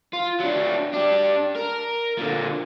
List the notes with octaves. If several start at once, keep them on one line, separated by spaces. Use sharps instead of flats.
F4
F#3 D4
D4 G4
A#4
A#2 D3